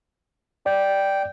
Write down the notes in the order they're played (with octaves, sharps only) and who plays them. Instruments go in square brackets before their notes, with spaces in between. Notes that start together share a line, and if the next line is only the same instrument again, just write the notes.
[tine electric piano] D5 [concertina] G5